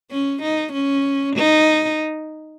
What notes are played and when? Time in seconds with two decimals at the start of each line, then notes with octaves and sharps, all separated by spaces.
0.11 C#4
0.42 D#4
0.73 C#4
1.36 D#4